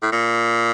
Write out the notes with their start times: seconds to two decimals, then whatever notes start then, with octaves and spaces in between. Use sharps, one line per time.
0.02 A2
0.12 A#2